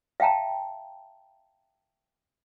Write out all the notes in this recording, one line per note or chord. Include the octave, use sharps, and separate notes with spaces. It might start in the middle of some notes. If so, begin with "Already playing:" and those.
E5 F5 G5 A5 A#5